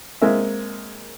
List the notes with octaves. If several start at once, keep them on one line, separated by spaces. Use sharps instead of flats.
G#3 A#3 C4 E5